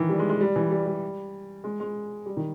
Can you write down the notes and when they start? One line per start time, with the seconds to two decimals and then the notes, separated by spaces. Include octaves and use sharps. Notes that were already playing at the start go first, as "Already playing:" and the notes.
Already playing: D#3 E3
0.09 G3
0.19 G#3
0.30 G#3
0.41 G3
0.56 E3
0.71 G3
0.86 G3
1.64 G#3
1.80 G#3
2.26 G3
2.37 D#3